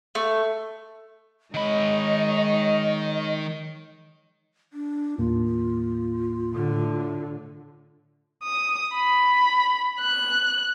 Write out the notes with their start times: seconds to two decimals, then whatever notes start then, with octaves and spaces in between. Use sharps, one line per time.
0.15 A3
1.54 D#3 G#3 D#4 C#5 D#5 B5
4.73 D4
5.18 D#2 A2 A#3 F4
6.54 A2 D3
8.43 D#6
8.95 B5
10.00 F#6